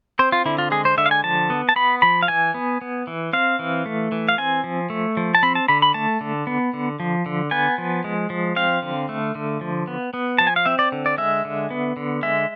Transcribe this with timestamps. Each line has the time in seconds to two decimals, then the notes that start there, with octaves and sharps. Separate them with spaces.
0.19 C4 C5
0.32 F4
0.46 D3 E4
0.58 F4
0.71 G#3 G#4
0.85 C5
0.98 D3 E5
1.06 F5
1.11 G#5
1.24 F3 A5
1.50 B3
1.69 A5
1.76 B3 B5
2.02 F3 B5
2.23 F5
2.28 E3 G#5
2.54 B3
2.81 B3
3.07 E3
3.33 C4 F5
3.59 E3
3.86 A3
4.12 E3
4.29 F5
4.38 C4 G#5
4.64 F3
4.90 A3
5.17 F3
5.35 A5
5.43 C4 B5
5.55 A5
5.68 D3 B5
5.82 B5
5.94 A3 A5
6.21 D3
6.47 B3
6.74 D3
7.00 F3
7.26 D3
7.51 B3 G#5
7.78 F3
8.04 G#3
8.30 F3
8.56 C4 F5
8.82 D3
9.09 A3
9.35 D3
9.61 F3
9.87 B3
10.14 B3
10.38 F3 A5
10.47 G#5
10.56 F5
10.66 C4 E5
10.79 D5
10.92 D3
11.06 D5
11.18 G#3 E5
11.45 D3
11.70 B3
11.97 D3
12.23 G#3 E5